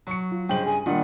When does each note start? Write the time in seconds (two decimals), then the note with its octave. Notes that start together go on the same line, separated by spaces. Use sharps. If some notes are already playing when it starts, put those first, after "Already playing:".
0.07 F#3 C#6 C#7
0.32 F4
0.49 G2 C#3 G#3 C5 G5 F#7
0.66 G#4 G#5
0.86 A#2 D#3 G3 A#3 D4 F4 G4 F#5